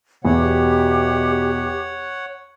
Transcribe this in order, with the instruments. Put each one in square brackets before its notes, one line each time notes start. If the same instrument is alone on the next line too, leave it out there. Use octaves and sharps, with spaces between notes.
[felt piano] E2 [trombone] B2 [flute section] G4 [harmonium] C#5 F#5